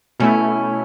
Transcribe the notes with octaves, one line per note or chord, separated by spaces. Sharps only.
B2 A3 C#4 E4